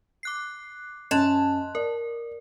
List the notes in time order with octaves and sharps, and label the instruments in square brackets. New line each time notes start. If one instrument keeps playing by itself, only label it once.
[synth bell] D6 F#6 C7
[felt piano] F#2 C#4 [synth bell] D#5 C6 F#6 [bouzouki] A5
[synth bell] A#4 [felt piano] D5